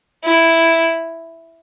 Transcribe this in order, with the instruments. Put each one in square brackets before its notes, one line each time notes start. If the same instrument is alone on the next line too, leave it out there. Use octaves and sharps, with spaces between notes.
[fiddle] E4